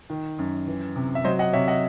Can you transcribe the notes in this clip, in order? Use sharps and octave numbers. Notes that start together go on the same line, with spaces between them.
D#3
F#2
E3
C3
E5
F#3 C5 D#5
D#5 F#5
C3 C#5 E5
D#5 F#5